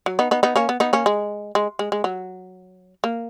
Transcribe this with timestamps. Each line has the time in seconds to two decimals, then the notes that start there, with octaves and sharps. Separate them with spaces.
0.06 F#3
0.19 B3 D#4
0.31 B3 D#4
0.43 B3 D#4
0.56 A#3 C#4
0.69 B3
0.80 B3 D#4
0.93 A#3 C#4
1.06 G#3
1.55 G#3
1.79 G#3
1.92 G#3
2.04 F#3
3.04 A#3